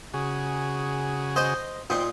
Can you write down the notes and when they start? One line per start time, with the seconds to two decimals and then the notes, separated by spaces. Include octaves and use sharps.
0.14 C#3 F#4 G#4
1.36 C5 D#5
1.90 A#2 D#4 C5 G5